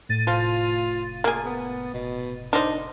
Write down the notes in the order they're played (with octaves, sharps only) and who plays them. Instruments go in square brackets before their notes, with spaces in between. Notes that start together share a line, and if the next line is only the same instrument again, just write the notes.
[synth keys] A2 A6 D#7
[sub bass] F1 [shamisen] F3 [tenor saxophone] F4
[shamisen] A#3 G#4
[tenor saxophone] B3
[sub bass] F1 [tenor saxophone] B2
[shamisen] D4 C5 [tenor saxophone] D#4